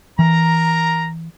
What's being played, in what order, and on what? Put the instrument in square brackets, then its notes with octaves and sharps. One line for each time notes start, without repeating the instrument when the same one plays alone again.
[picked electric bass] E3 [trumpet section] A#4 A#5